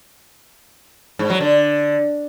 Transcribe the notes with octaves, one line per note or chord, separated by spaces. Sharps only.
G#2
F#3
D3